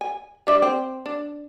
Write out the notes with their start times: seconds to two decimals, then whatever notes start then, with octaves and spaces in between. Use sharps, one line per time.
0.01 G#5
0.47 G3 D4 E5
0.62 C4
1.06 D4